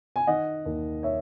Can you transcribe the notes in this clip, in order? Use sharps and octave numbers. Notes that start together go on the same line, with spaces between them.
G#5
D#3 D#5 F#5
D#2
C#5 E5